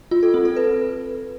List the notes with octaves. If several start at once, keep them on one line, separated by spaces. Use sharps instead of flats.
F4
A4
C4
A4
B4